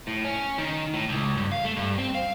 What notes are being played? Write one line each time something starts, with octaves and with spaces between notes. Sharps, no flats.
A2
C#4
D#3
A2
C#2
G2
F5
A3
G2
C4
F5